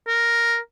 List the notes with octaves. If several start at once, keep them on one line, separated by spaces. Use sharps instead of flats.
A#4